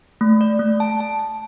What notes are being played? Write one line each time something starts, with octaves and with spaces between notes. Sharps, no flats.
A3
D5
A3
A5
A5
A5